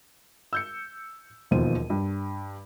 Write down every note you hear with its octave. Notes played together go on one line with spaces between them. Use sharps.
E6 G6 C#7
E1 D#2 B2 F3 C5 D#7
G2